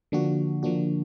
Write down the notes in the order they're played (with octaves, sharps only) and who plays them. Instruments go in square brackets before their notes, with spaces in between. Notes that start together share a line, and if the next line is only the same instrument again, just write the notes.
[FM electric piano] D3 F3 A#3 D4 F#4
D3 F3 A#3 D4 F#4